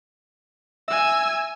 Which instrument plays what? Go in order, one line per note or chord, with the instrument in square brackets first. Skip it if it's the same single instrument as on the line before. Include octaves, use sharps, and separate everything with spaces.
[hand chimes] E5 [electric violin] G#5 E6